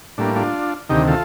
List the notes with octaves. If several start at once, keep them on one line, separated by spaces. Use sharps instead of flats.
A2 G3 A#3 D4
D4 F4
D2 C3 D#3 D#4 G4
F4 A4